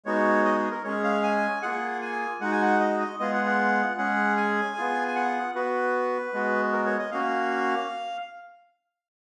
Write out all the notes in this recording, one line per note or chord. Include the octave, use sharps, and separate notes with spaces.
G#3 B3 D#4 F#4 C#5
D#5
G#4
A#4
G#3 C#4 G#4 C#5
F5
G#5
A#3 F4 G#4 F#5
G#5
G#3 D#4 F#4 F#5
G#5
F#5
D#5
D#5
G#3 B3 F4 G#4 D#5
F#5
F#5
G#3 C#4 G#4 F#5
G#5
B3 F4 G#4
G#5
F#5
B3 F#4 B4
G#3 B3 F#4
A#4
C#5
D#5
A#3 C#4 F#4 F5